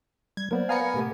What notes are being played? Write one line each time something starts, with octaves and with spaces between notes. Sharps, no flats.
G3 G#6
F#3 A#3 B3 A#4 C5 D5
B3 F5 G#5 A#5 C#7
A2 C3 A3 G4 A#4